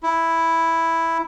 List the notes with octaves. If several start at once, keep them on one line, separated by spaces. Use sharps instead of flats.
E4